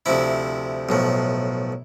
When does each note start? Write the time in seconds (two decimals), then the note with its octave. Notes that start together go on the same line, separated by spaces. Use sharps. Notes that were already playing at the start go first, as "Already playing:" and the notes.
0.06 D2 C3 F3 E4
0.89 B1 A2 F3